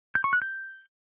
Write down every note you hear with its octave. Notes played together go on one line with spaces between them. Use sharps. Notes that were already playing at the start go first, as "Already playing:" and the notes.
G6
C#6
F#6
G6